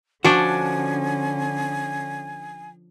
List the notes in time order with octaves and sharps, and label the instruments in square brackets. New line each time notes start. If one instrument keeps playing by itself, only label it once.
[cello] D3 C#4 [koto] F3 D4 [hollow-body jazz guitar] F#4 [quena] G#5